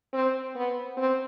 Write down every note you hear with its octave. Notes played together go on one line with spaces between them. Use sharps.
C4
B3
C4